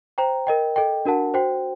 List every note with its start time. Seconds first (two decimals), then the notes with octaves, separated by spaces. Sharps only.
0.18 C5 G5 A#5
0.47 A#4 D#5 G5
0.76 A4 D#5 G5
1.05 D4 F#4 A#4 F#5 A5
1.34 F#4 C5 G5